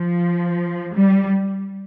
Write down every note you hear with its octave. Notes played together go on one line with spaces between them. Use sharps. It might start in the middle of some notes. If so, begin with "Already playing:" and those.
Already playing: F3
G3